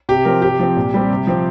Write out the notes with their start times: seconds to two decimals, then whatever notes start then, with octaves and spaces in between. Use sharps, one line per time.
0.09 C3 G4
0.25 F3 C4 A#4
0.42 C3 G4
0.59 F3 C4
0.76 A#2
0.94 G3 C4
1.10 C3
1.27 F3 C4